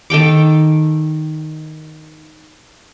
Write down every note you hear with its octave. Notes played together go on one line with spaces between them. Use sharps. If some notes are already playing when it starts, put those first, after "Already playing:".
D#3 A4 G5 D6